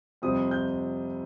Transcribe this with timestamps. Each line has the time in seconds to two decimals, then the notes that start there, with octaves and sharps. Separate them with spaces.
0.22 F2 C3 G3 C4 D#6
0.51 G6